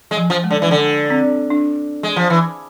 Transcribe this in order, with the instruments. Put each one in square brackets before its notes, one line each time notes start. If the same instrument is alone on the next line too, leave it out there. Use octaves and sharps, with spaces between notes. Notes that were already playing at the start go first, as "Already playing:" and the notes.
[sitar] G#3
[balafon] F3
[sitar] F3
[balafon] G#3
[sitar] D3
E3
D3
[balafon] C4
D4
[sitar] G#3
F3
E3